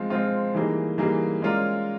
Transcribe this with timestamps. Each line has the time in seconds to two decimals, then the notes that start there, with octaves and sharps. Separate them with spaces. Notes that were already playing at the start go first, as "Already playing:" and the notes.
Already playing: F3 G#3 C4 F4
0.10 F3 G#3 C4 F4
0.54 E3 G3 A#3 D#4 G#4
0.98 E3 G3 A#3 D#4 G#4
1.42 G#3 C#4 F4 A#4 D5